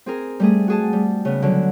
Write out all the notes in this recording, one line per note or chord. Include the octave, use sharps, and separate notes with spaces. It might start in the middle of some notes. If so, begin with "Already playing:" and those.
C4 G#4 A#4
G3 A3 G#4
F#4 G#4 A5
G3
C#3 B3
D3 F#3